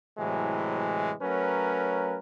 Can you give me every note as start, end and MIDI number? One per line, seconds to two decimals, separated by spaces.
0.19 1.13 45
0.19 1.13 48
0.19 1.13 52
0.19 1.13 54
0.19 1.13 56
1.22 2.19 54
1.22 2.19 57
1.22 2.19 61
1.22 2.19 70
1.22 2.19 71